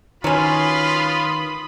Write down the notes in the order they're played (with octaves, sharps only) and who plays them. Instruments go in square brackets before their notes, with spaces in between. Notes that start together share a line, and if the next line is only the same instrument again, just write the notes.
[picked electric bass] D#3 [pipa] F#3 C#4 [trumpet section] F4 B4 C6 [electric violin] B5 D#6